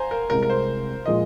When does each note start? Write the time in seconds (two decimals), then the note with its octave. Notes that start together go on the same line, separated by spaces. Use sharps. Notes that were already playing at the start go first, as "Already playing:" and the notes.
Already playing: C5 G#5 A#5
0.11 A#4
0.30 C2 C3 G#3 A#4
0.43 A#4
0.50 C5
1.06 A#2 F3 G#3 F4 D#5